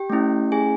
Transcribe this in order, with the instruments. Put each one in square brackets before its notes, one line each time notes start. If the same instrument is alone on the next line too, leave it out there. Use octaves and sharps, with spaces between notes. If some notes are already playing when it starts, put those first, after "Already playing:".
Already playing: [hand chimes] G4 G5
A3 C#4 E4
G#4 G#5